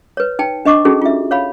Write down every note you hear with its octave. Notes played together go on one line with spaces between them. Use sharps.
B4 C#5
D#4 G5 A5
D4 D#5 C#6 D6
C#4 D#4 F#4 G#4 A4
F4 E5
C#5 F5 B5